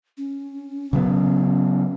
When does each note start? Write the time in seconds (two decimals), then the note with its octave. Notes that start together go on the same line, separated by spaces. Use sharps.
0.17 C#4
0.93 C#3 F#3 B3